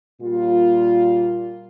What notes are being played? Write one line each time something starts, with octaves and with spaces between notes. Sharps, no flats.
A#2 G3 A#3 F4